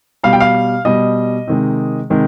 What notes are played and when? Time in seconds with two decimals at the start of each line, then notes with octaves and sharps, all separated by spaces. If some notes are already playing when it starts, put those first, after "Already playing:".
0.24 B2 G3 F5
0.33 G5
0.40 F5
0.85 B2 G3 D#5
1.48 C3 D#3 G#3
2.10 C3 D#3 G#3